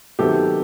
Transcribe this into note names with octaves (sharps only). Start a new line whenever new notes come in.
C3 D#3 F#3 B3 G4 A4